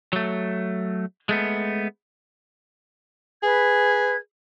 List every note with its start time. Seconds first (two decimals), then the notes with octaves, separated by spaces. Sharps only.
0.13 F#3 A3
1.29 G#3 A3 B3
3.43 G#4 B4 G#6